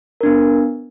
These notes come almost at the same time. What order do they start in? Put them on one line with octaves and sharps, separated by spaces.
A#4 D4 B3